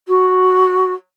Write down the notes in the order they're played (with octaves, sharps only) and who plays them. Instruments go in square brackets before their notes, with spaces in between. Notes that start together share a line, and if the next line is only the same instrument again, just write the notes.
[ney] F#4